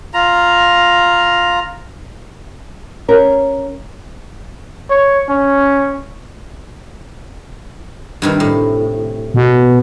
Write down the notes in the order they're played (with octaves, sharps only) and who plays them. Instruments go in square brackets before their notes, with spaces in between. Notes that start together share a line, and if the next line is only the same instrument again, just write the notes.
[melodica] F4 A#5
[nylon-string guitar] C#4 A#4
[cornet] C#5
C#4
[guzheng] G2 C3 D#3
A2
[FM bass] B2